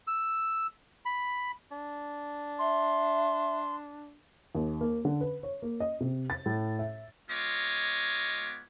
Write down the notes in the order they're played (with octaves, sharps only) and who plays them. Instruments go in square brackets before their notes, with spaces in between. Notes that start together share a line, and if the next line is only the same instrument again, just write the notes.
[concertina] E6
B5
[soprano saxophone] D4
[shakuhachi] E5 [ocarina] C6
[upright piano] D#2
A#3
D3
B4
C#5
A#3
D#5
C3
A6
A2
E5
[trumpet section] G#3 B3 F4 C#5 D#5 D6